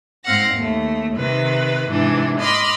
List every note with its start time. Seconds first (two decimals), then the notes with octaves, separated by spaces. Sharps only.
0.24 G#2 C4 F5 F#5 A#6
0.54 D#2 A3
1.16 C3 D#3 B4
1.90 G#2 C3 E3 D4
2.39 D#5 B5 C6 D6 F6